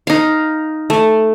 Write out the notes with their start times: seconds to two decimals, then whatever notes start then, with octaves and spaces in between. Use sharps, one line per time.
0.07 D#4 F5
0.90 A3